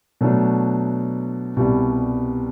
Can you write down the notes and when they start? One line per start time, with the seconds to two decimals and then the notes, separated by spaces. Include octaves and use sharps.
0.21 B2 F#3 A3 D4
1.56 C2 B2 G3